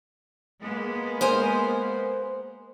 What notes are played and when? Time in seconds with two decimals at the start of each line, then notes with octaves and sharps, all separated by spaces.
0.61 G#3 A#3 B3
1.21 A#4 C5 G#5